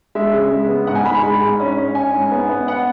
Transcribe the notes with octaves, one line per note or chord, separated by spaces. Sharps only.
G#3 E5
C#3
G#3
B3
G#2 F#5
G#5
G#3 B5
G#5
G#3 B5
G#2
C#4
C#4
C#4 G#5
G#2
B3
B3
B3 F#5